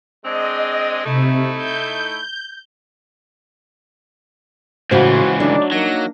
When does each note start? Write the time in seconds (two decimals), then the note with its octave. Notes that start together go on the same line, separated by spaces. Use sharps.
0.25 G#3 C4 D4 D#5
1.05 C3 A3 D#4 E4
1.56 G6
4.91 C#2 A2 C#3 E3 F#4 C5
5.40 F#3 A3 D4 D#4 D5
5.72 F#3 A#3 D#4 A#6